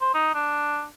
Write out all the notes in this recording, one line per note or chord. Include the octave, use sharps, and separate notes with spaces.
C5
D#4
D4